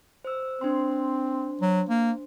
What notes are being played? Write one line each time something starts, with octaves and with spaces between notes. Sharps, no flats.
C5 E6
C4 D4 C5 C6
F#3
A#3